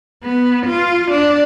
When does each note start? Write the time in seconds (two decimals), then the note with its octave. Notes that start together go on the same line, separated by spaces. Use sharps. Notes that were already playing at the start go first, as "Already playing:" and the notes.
0.23 B3
0.66 F4
1.11 D4